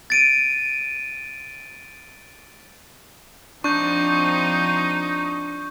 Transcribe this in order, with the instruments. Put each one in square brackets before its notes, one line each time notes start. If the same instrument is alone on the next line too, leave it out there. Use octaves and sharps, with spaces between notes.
[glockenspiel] A6 D7 D#7
[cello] F3 C4 [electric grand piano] D4 [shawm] D#4 [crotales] C#6 G6